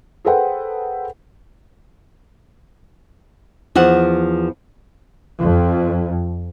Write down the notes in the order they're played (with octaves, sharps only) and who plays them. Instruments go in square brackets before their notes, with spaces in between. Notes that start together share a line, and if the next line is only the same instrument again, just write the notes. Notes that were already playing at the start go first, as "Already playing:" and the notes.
[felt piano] G#4 A4 B4 C5 F#5 G5
[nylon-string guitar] E2 F3 F#5
[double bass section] F2